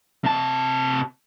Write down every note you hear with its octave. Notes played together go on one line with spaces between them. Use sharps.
C3 A5